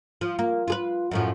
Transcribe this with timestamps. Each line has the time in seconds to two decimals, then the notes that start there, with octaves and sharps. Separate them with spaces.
0.21 F3
0.39 A#3
0.68 F4 G#4 B4
1.11 F#2 A2 F3